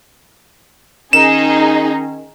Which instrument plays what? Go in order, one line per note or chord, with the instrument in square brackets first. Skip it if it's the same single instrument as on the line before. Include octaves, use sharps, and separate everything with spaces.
[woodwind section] D#3 C#4 [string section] D#4 G#4 [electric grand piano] E7